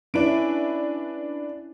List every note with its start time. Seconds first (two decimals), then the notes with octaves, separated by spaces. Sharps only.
0.14 C#4 D4 E4 B4 D7